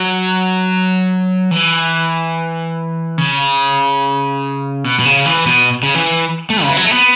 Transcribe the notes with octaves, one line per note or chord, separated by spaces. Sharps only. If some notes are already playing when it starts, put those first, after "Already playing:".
Already playing: F#3
E3
C#3
B2
B2
C#3
E3
B2
C#3
E3
A3
C#3
E3
F#3
A3
B3